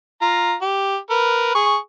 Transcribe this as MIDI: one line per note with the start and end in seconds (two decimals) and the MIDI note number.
0.21 0.54 65
0.21 0.54 82
0.62 0.97 67
1.10 1.53 70
1.10 1.53 71
1.55 1.77 68
1.55 1.77 85